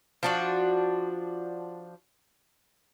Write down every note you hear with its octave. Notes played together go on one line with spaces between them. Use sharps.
F3 D4 F#4